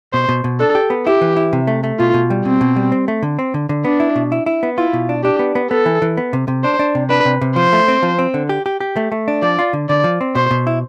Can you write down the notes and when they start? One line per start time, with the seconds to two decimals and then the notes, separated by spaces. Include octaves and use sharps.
0.13 B2 C5
0.29 B2
0.44 B2
0.60 D4 A4
0.75 G4
0.90 B3
1.06 E4 G4
1.21 E3
1.36 E4
1.53 C3
1.67 A3
1.84 A3
1.99 B2 F4
2.14 B2
2.30 G3
2.45 B2 C4
2.61 B2
2.76 G3
2.92 C4
3.08 A3
3.23 D3
3.39 C4
3.54 D3
3.69 D3
3.85 B3 D4
4.00 E4
4.16 B2
4.32 E4
4.46 E4
4.63 B3
4.78 E4 F4
4.93 B2
5.09 D4
5.24 D4 G4
5.39 B3
5.55 B3
5.71 B3 A4
5.86 E3
6.02 E3
6.17 B3
6.33 C3
6.48 C3
6.64 D4 C5
6.79 D4
6.95 C3
7.10 D4 B4
7.25 C3
7.41 C3
7.56 F3 C5
7.73 A3
7.88 C4
8.03 F3
8.19 C4
8.34 D3
8.49 G4
8.66 G4
8.80 G4
8.96 A3
9.12 A3
9.28 D4
9.42 F3 D5
9.59 F4
9.73 D3
9.89 D3 D5
10.04 F3
10.21 C4
10.35 B2 C5
10.51 B2
10.67 E4